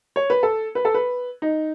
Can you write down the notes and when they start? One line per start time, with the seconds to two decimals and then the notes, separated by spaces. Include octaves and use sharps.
0.16 C#5
0.30 B4
0.43 A4
0.75 B4
0.85 A4
0.94 B4
1.42 D#4